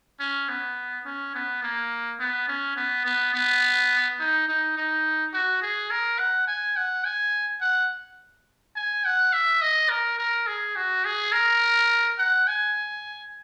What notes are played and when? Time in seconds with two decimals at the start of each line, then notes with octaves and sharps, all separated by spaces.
0.20 C#4
0.49 B3
1.05 C#4
1.35 B3
1.63 A#3
2.20 B3
2.48 C#4
2.76 B3
3.05 B3
3.34 B3
4.20 D#4
4.48 D#4
4.77 D#4
5.33 F#4
5.62 G#4
5.91 A#4
6.19 F#5
6.48 G#5
6.76 F#5
7.05 G#5
7.61 F#5
8.76 G#5
9.05 F#5
9.33 E5
9.62 D#5
9.89 A#4
10.19 A#4
10.47 G#4
10.76 F#4
11.05 G#4
11.33 A#4
12.19 F#5
12.47 G#5